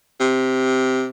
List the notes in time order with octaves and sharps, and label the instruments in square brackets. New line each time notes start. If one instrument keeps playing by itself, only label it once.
[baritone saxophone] C3